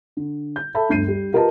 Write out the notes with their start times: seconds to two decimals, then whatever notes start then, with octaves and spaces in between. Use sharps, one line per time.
0.17 D3
0.56 G6
0.75 A4 E5 A5 B5
0.89 G1 D2 G6 C7 D#7
1.08 G3
1.33 F4 G4 A#4 B4 D#5 A5